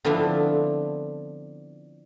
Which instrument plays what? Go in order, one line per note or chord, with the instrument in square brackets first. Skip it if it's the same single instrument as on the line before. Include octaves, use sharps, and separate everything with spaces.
[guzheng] D3 F3 B3 C4 D4 E4